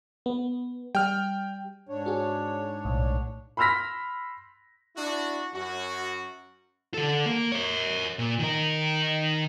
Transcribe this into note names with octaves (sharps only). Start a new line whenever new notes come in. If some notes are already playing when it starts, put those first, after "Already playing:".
B3
G3 G5 F6
G#2 D4 C#5
F#4 G#4
B1 A2
B5 C6 E6 F6 A#6 B6
D4 E4 F#4
F#2 F#4
D3 A4
A#3
A#4 C#5
A#2
D#3 A#4